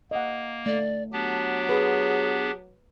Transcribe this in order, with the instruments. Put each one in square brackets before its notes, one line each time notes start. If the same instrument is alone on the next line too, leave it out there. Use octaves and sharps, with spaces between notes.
[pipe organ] A#3 [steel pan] D#5 F#5
[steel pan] A3 [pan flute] D5
[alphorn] F#3 [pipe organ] B3 D4 G4 [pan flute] A5
[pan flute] G#4 [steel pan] B4